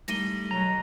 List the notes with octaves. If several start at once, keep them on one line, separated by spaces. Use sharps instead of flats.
D#3 G3 A3 A#6 D#7 G7
B2 F#3 A#5